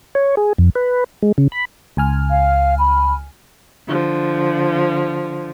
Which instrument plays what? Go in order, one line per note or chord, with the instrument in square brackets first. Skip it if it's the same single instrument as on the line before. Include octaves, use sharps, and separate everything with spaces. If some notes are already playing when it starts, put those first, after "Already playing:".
[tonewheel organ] C#5
G#4
F2
B4
G#3
C#3
B5
[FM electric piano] C#2 G#5 F6
[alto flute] F5
B5
[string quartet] D3 F3